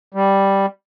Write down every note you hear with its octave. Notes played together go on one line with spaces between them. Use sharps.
G3